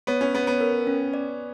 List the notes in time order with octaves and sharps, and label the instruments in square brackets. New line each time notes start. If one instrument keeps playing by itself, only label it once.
[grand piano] B3 [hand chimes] C#5
[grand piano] C#4
[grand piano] B3 [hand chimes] C#5
[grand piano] B3
[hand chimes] A#4
C#4
D5